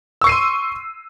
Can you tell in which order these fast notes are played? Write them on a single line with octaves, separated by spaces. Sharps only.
E6 C#6 C7 D#7 C6